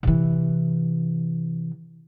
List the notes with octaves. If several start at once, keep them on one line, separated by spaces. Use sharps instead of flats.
C3 E3